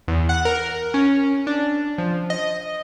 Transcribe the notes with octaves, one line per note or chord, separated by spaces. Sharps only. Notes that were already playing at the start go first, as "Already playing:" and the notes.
E2
F#5
A#4
C#4
D4
F3
D#5